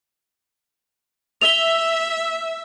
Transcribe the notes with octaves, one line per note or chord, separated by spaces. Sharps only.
E5 F7 G7